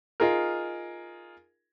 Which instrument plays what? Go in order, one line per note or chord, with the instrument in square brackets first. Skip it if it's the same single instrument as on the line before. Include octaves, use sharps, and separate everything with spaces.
[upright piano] D#4 F4 G#4 A#4